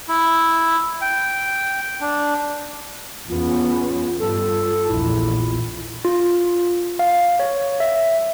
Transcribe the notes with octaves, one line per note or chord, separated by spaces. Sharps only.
E4
G5
D4
E2 B3 C#4 F4
G2 A4
A#1 E2 E4
F4
F5
C#5
E5